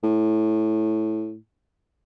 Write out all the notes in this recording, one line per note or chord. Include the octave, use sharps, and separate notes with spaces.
A2